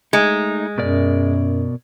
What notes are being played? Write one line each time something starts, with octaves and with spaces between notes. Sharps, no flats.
G#3 A3 D#4
F#2 B2 A#4 D5